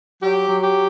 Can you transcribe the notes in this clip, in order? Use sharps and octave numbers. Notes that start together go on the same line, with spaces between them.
F#3 G4
F#3
G4